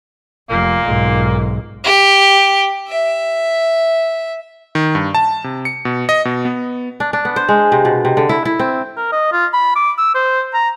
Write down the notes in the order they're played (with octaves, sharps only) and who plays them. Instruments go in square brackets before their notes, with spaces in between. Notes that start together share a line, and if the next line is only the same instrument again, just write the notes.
[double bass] F1 [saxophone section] A#2 A#3
[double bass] B1 G#2
[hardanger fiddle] G4
E5
[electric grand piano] D#3
G2
A5
C3
C#7
B2
D#5
B2
B3
[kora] D4
D4
B3
C5
G#3
C3
B2
C3
D3
E4
E4
C4
[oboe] A#4
D#5
F4
B5
D6
E6
C5
A#5